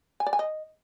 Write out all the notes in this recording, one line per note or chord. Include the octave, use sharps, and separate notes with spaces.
G#5
D5
G#5
D#5